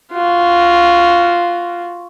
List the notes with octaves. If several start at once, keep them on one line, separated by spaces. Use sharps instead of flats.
F4 F#4